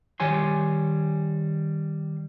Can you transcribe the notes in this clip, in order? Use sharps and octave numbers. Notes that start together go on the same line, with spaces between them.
D#3 G3 C#5 G#5 C6